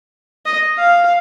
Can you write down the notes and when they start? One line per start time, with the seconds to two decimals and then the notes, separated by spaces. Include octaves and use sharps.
0.46 D#5
0.78 F5